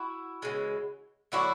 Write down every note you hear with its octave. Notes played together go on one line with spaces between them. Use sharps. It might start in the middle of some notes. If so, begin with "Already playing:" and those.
Already playing: E4 F#4
C#3 E3 G#3
D3 F#3 A3 E4 F#4